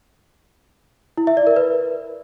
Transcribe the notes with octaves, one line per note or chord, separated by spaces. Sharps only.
E4
E5
D5
A#4
B4